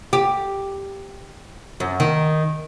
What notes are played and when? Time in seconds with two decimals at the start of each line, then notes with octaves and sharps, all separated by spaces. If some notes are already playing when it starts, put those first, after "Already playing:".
0.13 G4
1.80 F#2
2.00 D#3